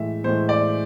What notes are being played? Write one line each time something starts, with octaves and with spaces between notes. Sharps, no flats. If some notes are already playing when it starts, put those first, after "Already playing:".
Already playing: A2 E3 G#3 E5
A2 E3 G#3 C5
D5